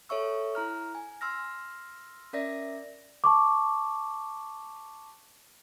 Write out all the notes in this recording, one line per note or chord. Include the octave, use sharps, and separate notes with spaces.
A4 C#5 E5 C#6 E6
E4 A#5 F6
G#5
C6 E6 F6 A#6
C#4 A#4 D5 E5 A#6
A5 C#6 D6